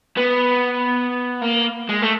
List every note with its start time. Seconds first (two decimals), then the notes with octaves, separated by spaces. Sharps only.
0.17 B3
1.42 A#3
1.89 G#3
2.02 A3